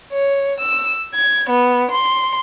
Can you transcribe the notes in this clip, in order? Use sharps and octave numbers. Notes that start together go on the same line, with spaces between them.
C#5
E6
G#6
B3
C6